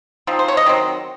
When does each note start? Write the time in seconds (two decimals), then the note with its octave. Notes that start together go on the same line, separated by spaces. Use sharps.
0.27 F3 C4 D#4
0.39 C5
0.48 C#5
0.57 D#5
0.66 D#3 F#3 C4